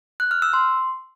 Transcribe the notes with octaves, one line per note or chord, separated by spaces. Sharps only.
F#6
F6
E6
C6